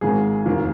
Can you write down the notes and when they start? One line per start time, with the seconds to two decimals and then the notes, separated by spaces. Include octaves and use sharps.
0.01 G#1 G#2 D#3 G#4
0.46 F1 D#2 D#3